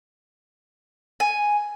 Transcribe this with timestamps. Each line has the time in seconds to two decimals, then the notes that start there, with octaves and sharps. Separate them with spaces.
1.20 G#5